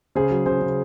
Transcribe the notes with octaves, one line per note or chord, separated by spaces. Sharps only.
C#3 G#4 C5
F#3
C#3 G#4 C5
C#3